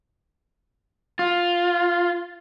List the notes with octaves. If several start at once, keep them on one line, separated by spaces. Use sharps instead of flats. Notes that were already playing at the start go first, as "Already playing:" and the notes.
F4